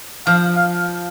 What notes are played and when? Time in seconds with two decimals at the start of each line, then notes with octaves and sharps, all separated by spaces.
0.27 F3 F5
0.56 F5